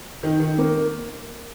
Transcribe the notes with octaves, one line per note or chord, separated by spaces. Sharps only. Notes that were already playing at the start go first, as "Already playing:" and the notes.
D#3
D#3
A#3